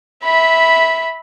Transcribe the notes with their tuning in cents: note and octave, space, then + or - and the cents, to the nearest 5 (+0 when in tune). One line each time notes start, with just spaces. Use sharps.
E5 -15 B5 +0